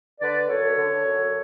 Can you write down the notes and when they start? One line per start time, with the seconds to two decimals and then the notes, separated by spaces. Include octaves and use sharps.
0.20 D3 B4 D5
0.47 F#2 A4 C#5
0.76 D3
1.02 F#2